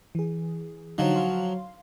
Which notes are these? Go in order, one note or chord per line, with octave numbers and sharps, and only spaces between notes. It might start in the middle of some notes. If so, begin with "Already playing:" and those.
E3 G#4
D3 F3 F#3 D#4
F5 C6